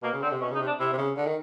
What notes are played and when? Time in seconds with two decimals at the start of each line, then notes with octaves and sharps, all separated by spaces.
0.03 B2 A#3
0.13 C#3
0.22 D3 C4
0.32 C3
0.41 B2 C#4
0.51 C#3
0.55 D#4
0.60 C3
0.67 D4
0.80 C3 E4
0.93 C3
0.98 C#3
1.17 D3
1.27 D#3